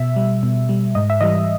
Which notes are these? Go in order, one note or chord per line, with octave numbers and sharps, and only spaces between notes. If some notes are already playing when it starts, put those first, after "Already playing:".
Already playing: B2 E5
G3
B2
G3
G#2 D#5
E5
E3 G3 D#5